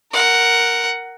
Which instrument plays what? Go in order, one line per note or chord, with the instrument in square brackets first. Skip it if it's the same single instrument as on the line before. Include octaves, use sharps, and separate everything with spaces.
[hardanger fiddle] A#4 F#5